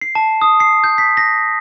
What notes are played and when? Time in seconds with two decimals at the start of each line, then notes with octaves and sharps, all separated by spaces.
0.01 C7
0.15 A5
0.42 D#6
0.60 C7
0.84 G6
0.98 B6
1.17 A#6